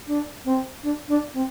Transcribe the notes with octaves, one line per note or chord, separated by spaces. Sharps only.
D4
C4
D4
D4
C4